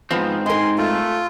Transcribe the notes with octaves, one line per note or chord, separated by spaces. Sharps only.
G#2 F3 B3 C4
D#4 A#4 G#5 C6
A3 F4